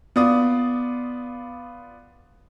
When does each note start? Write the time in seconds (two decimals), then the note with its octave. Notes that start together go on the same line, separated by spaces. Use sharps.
0.16 B3 F4 D5 D#6